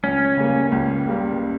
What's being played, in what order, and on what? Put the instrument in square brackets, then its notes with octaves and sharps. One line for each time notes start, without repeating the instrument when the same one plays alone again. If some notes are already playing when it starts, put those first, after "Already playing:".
[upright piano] C#2 [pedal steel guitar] C#4
[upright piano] C#3 G3 A#3
C#2
C#3 G3 A#3